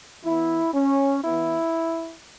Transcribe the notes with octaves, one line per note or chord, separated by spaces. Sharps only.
E3 B3 E4
C#4
E3 B3 E4